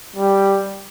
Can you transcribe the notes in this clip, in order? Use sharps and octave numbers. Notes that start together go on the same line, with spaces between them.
G3